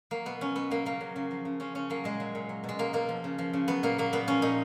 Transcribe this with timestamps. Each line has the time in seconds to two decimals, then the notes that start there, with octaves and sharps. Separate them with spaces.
0.11 F#3 A#3
0.25 B2 B3
0.41 F#3 C#4
0.56 B2 B3
0.70 F#3 A#3
0.85 C#3 A#3
1.01 F#3
1.16 C#3
1.31 F3
1.45 C#3
1.60 F3 C#4
1.75 C#3 C#4
1.90 F#3 A#3
2.04 A#2 G#3
2.20 F#3
2.35 A#2
2.49 F#3
2.64 B2 G#3
2.79 F#3 A#3
2.93 B2 A#3
3.09 F3
3.24 C#3
3.38 F3
3.53 C#3
3.68 F#3 B3
3.83 A#2 A#3
3.98 F#3 A#3
4.13 A#2 B3
4.28 F3 C#4
4.42 A#2 D#4